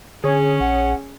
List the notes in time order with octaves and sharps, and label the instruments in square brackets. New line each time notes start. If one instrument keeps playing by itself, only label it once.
[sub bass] D3 [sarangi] C#4 [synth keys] G#4 C#5
[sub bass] A#1 [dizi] F#5